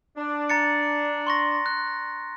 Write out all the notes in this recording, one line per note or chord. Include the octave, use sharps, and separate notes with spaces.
D4
A#5 A6 C#7
C6 C#6 A#6
F#6